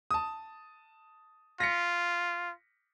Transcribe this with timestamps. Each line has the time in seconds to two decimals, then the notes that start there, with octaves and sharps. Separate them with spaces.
0.11 A5 D#6
1.60 F4 A#6 B6 C#7